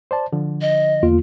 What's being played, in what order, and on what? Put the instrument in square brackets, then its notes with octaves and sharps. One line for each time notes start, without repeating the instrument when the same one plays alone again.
[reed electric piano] C5 D5 A5
D3 F3
[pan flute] D#5
[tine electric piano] E2 A#3 F4